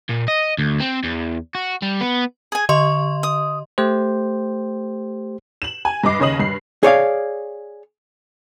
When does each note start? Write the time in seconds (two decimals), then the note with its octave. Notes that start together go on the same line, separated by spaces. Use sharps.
0.10 A#2
0.28 D#5
0.58 D2
0.80 C4
1.04 E2
1.55 F#4
1.82 G3
2.01 B3
2.52 G#4 G#5
2.69 D3 D#5 C6 C#6
3.23 D#6
3.78 A3 G4 C5
5.62 E7 F#7
5.85 G#5
6.04 G2 D#5 D6 C7
6.19 D#2 C#3 C#5 D#5 D#6 F#7
6.39 G2 C7
6.83 G#4 C#5 D5 F5